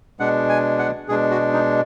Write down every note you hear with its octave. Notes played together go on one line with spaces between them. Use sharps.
B2 G#3 D4 F#5
G#5
F#5
B2 G#3 D4 G#4
F#4
D#4